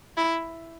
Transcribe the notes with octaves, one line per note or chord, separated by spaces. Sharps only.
E4